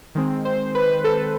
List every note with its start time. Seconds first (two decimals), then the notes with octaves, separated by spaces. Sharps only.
0.15 D#3 G#3 C4
0.45 C5
0.75 B4
1.04 A4